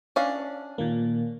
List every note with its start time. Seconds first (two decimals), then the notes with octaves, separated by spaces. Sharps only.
0.16 C#4 D4 F5
0.78 A#2 D#3 A#3